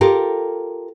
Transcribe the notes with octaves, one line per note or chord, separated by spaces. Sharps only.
F4 G4 A4 A#4